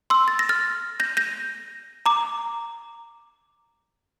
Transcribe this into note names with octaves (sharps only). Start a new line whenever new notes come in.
C6 E6
A6
A#6
F6 A6
G6 A#6
G6 A#6
A#5 D6